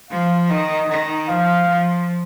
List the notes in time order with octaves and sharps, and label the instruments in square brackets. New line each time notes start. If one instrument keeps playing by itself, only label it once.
[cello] F3 [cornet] F5
[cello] D#3 [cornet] D#5
[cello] D#3
[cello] F3 [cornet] F5
[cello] F3